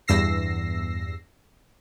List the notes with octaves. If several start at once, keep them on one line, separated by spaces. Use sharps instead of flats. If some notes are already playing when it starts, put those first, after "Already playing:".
E2 G2 E6 A#6 C7